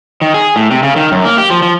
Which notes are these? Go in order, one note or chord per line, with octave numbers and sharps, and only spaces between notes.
D#3
G#4
A2
C3
C#3
D#3
F#2
A#3
G4
F3
F3